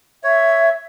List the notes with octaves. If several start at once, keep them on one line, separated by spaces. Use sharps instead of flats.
C#5 E5